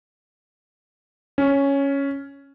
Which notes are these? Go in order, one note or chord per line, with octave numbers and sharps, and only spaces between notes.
C#4